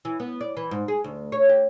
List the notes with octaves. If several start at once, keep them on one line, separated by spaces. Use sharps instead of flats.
E3
B3
D5
E3
G#2
G#4
D2
C#5
G4